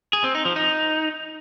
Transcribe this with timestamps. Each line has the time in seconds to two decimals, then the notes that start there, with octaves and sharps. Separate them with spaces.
0.13 G#4
0.24 C4
0.35 D#4
0.45 F3
0.56 D#4